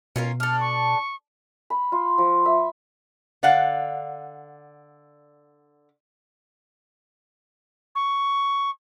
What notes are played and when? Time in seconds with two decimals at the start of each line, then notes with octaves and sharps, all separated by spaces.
0.16 B2 C#4 F4 A#4
0.40 D4 A4 F6
0.60 C#6
1.70 B5
1.92 F4
2.18 F3
2.46 E5
3.43 D3 D5 F5 F#5
7.95 C#6